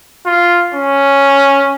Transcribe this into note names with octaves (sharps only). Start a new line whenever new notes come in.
F4
C#4